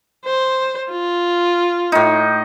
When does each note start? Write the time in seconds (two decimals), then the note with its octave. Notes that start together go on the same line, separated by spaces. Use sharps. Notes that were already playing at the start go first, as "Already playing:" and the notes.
0.25 C5
0.90 F4
1.92 A2 D#4